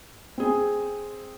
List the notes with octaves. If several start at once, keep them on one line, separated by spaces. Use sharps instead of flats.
C4 G#4